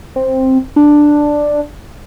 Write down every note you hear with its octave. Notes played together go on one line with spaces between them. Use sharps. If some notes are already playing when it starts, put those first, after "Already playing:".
C4
D4